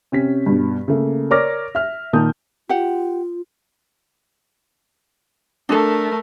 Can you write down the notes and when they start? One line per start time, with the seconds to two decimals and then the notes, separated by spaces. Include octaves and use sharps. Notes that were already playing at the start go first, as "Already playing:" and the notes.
0.12 C3 C#4 B6
0.46 G2 B2
0.88 C#3 A3 A#3
1.31 A#4 C#5 D5 D6 F6 A#6
1.75 E5 F6
2.13 A#2 D#3 A#4 A5 D#6 G6
2.69 F4 G4 F#5
5.69 A3 D4 A4 A#4